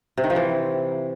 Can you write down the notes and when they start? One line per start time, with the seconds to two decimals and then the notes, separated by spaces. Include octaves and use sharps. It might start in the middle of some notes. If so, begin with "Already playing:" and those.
0.17 C3
0.24 D#3
0.30 F3
0.36 E3